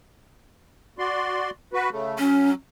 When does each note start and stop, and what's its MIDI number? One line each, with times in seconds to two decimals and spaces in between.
0.99 1.50 66
0.99 1.50 74
0.99 1.50 84
1.73 1.90 66
1.73 1.90 71
1.91 2.18 49
1.91 2.18 57
2.18 2.54 54
2.18 2.50 61